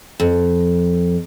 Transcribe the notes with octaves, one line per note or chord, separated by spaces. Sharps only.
F2